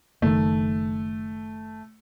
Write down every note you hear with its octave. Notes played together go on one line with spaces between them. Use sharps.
F#1 D#3 A3